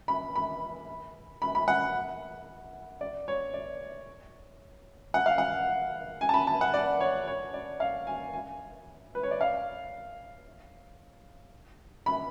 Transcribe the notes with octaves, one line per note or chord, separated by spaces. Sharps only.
B5
B5
B5
B5
F#5
D5
C#5
D5
F#5
F5
F#5
G#5
A5
B5
A5
F#5
D5
C#5
C#5
D5
F5
G#5
G#5
B4
C#5
D5
F5
B5